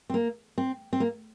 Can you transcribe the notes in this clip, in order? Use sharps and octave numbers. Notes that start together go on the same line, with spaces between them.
C4
A#3
C4
C4
A#3